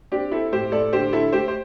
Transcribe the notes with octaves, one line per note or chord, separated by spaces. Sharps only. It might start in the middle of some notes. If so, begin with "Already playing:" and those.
C4 D4 G4
C4 E4 A4
A2 G4 C5
A2 A4 D5
D3 G4 C5
D3 E4 A4
A3 G4 C5
C5